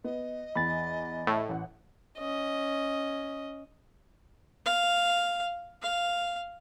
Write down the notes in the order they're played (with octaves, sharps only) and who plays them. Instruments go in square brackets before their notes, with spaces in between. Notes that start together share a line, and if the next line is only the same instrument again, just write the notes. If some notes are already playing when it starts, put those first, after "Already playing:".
[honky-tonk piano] B3 [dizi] D#5
[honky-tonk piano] E2 [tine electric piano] B5 A6
[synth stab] A2
[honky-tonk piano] A1 F#5
[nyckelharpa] C#4 D#5
F5
F5